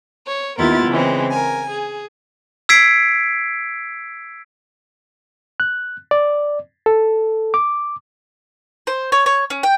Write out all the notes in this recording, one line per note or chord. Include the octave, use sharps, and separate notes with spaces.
C#5
D#2 B3 E4 F4 A#4 A6
C#3 E3 G#3 C4
A#4 G#5
G#4
E6 G#6 B6 C7 D7
F#6
D5
A4
D6
C5
C#5
C#5
C#4
G5